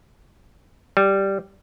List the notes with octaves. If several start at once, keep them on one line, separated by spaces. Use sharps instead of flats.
G3